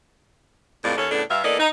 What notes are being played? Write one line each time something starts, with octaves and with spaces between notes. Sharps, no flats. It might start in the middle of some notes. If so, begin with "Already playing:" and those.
F2 A2 G#3 A#3 G#4 D5
D#2 C#4 A4
A2 C#3 B3 D4 A4
G2 E5 F5
E3 A#3 B3 A4 D5 D#5
D#4